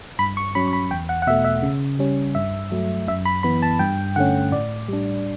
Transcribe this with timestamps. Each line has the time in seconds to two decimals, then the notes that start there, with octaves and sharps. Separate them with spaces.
0.19 G2 B5
0.37 C#6
0.55 F#3 C#4 B5
0.67 C#6
0.73 B5
0.91 E2 G5
1.09 F#5
1.22 F#5
1.27 B2 E5
1.30 A3
1.44 E5
1.63 C#3
1.99 G3 C#4
2.35 G2 E5
2.72 F#3 A3
3.08 F#2 E5
3.25 B5
3.43 E3 B3 B5
3.62 A5
3.79 G2 G5
4.16 D3 A3 C#4 F#5
4.52 A2 D5
4.88 G3 D4